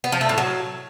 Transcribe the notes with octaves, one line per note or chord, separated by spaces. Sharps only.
B3
F3
A3
A2
F#3